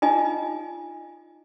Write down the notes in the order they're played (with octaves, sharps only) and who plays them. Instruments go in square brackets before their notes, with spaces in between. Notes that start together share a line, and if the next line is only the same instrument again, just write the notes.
[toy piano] D#4 F4 D#5 G#5